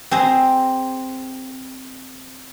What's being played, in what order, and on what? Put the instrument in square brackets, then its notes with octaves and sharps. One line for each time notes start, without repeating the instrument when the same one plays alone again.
[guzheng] C4 G#4 C5 A#5